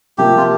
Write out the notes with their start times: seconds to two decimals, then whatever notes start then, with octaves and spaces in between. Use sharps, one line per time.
0.18 C3 F3 A#3 G4
0.37 F4